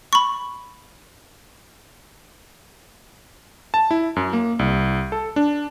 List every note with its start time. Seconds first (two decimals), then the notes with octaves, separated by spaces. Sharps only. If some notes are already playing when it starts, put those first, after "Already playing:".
0.13 B5 C#6
3.74 A5
3.91 E4
4.16 F#2
4.33 A#3
4.59 C2
5.12 A4
5.36 D4